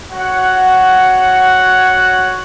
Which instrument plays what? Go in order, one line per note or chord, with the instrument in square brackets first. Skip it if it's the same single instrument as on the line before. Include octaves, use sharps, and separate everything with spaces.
[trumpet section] F#4 C#5 F#5